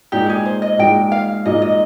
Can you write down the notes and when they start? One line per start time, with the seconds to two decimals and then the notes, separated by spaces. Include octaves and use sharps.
0.12 A#2 G#3 D#4 G4
0.29 G#4
0.45 C5
0.62 D#5
0.78 A#2 G#3 D#4 G5
1.12 F5
1.45 A#2 G#3 D#4 D#5
1.62 D#5